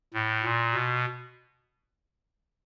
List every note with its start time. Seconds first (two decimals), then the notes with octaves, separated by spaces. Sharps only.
0.14 A2
0.44 A#2
0.74 B2